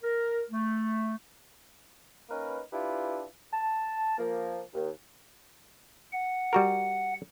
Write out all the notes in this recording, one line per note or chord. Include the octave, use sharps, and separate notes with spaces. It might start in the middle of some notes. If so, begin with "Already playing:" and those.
A#4
A3
A#3 C#4 D#4 A#4 B4
D4 E4 F4 G4 B4
A5
F3 A#3
D#2
F#5
G3 F#4 A#4